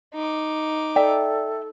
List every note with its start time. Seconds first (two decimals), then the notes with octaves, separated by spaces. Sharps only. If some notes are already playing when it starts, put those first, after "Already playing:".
0.14 D#4 D6
0.96 A4 D5 E5 G5